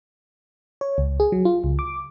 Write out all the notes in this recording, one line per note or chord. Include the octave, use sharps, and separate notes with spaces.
C#5
C#2
G#4
F#3
F4
C#2
D6